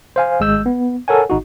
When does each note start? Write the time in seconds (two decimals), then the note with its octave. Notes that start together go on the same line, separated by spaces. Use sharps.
0.16 C5 F5 G#5
0.40 G#1 G#3 E6 G6
0.66 B3
1.08 A4 A#4 C#5 F#5 G#5
1.30 G#1 D#4 F#4